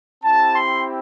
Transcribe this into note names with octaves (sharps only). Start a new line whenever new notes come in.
C4 E4 G4 A5
C6